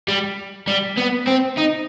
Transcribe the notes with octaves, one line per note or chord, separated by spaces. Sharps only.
G3
G3
B3
C4
D#4